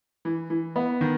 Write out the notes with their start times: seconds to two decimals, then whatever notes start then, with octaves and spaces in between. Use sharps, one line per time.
0.25 E3
0.50 E3
0.76 B3
1.01 D#3